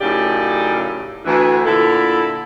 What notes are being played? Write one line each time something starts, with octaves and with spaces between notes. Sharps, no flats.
F#2 A2 C#3 D#4 G4 D5
D2 E3
A#2 D3 E4 A4